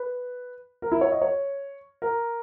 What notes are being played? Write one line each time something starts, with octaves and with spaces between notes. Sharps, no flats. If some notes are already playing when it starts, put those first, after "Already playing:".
Already playing: B4
A#4
E4
C#5
D#5
C#5
A#4